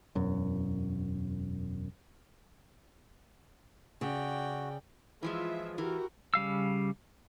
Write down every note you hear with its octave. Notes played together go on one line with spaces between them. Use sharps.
E1 F#2
C#3 F#4 D5 G5
E3 F3 G#3 F4 E5
E3 F#4 G4 A#4
C#3 G3 F5 E6